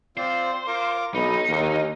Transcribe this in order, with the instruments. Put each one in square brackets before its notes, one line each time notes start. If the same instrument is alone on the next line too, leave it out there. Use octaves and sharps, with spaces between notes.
[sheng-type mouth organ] C4 F4 D5 [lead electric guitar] C5
[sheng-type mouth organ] F4 A#4 D6
[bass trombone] B1 [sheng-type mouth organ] B3 B4 [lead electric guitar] D#4
[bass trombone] D#2 [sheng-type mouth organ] A#4